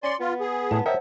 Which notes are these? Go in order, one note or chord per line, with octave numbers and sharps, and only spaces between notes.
C#4 D5 G#5 C6 C#7
B3 F4
G#4
A2 A5
A#4 C5 C#5 D#5 E5 F#5 G5